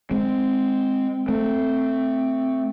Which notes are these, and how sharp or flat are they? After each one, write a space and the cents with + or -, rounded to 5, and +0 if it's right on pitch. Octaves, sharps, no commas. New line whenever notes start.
G#3 +0 C4 +0
A3 +10 C4 +0